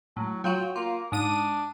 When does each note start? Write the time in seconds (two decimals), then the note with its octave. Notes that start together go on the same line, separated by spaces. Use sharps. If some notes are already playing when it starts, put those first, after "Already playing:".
0.17 A2 F#3
0.44 F#3 F4 F#4 G5
0.76 A#3 F4
1.12 G#2 D4 D#6 D#7